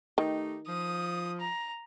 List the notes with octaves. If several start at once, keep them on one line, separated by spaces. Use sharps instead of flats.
D#3 A3 D#4 G4
F3 D#6
A#5